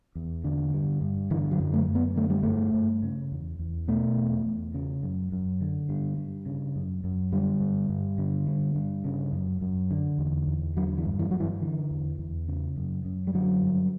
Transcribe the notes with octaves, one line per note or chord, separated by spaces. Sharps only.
E2
D3
G2
G2
D3 E3
F#3
F#2
A3
F#2
B3
D3 A3
G3
G2 A3
G2
C#3
E2
E2
B2 A3
E2
E2
C#3
F#2
F#2
D3
G2
G2
C#3
F#2
F#2
D3 G3
G2
G2
D3
G2
G2
C#3
F#2
F#2
D3
E2
E2
D3 F#3
E3
G2
E3
G2 F#3
E3
D3 E3
E2
E2
C#3
F#2
F#2
G3
D3 F#3
G2